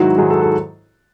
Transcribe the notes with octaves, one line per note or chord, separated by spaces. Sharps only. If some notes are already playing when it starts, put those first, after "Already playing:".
Already playing: G#2 D#3 F#3 E4 F#4
G#2 D#3 F#3 G#4
A4
A4